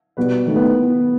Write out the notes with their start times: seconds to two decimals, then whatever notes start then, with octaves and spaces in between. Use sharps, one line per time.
0.17 B2 G3 B3 F#4 B4
0.46 D#3 A3 D#4
0.56 B3